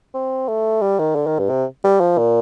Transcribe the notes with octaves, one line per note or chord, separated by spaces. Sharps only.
C4
A3
G3
D#3
D3
D#3
G2
C3
G3
F3
A#2